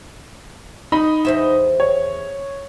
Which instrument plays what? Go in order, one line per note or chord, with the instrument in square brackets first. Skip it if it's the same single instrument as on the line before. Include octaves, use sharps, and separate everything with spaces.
[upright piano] D#4 D#5 B5
[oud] E2 C5 E5
[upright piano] C#5